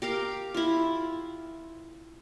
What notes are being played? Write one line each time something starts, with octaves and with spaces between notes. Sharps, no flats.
G4 A#4 F5 G5
E4 F4